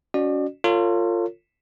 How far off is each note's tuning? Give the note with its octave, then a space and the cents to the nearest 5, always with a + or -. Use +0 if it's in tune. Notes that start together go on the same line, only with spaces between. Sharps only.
C#4 +30 F#4 +0 D5 +35
F4 +0 A4 +45 C#5 +0